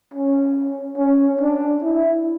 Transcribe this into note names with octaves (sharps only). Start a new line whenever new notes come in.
C#4
C#4
D4
E4